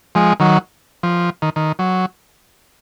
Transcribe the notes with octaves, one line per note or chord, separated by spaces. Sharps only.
F3 G#3
D#3 F#3
F3
D#3
D#3
F#3